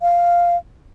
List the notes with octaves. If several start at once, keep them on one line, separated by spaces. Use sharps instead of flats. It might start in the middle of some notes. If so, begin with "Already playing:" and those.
F5